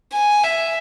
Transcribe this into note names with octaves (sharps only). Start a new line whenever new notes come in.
G#5
E5